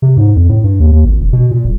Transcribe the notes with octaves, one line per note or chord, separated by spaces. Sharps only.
C3
G#2
F2
A2
G2
D#2
D#2
G#1
E1
B2
A#2
D#1